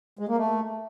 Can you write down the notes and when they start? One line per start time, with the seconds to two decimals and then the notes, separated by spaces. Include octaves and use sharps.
0.19 G#3
0.28 A#3
0.38 A3